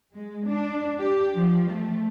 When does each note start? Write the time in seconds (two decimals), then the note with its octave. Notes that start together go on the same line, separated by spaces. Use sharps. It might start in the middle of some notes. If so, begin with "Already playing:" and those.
0.14 G#3
0.47 D4
0.99 G4
1.35 F3
1.71 A3